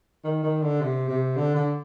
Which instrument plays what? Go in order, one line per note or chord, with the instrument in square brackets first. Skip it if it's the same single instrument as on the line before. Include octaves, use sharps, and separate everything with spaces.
[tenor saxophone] D#3
D#3
D3
C3
C3
D3
D3